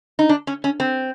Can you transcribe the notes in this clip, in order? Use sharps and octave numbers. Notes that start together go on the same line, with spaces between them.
D#4
D4
C#4
C#4
C4